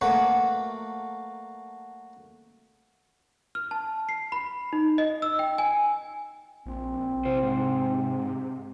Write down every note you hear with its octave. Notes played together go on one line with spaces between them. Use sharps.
F#3 A3 A#3 F#4 B4 C#5
F6
A5
C7
B5
D#4
D#5
E6
G5
G#5
A#1 C4
C3 E4 C5
G#2